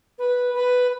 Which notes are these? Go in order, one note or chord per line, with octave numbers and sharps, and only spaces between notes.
B4
B4